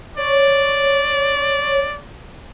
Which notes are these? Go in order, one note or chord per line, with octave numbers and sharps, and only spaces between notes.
C#5 D5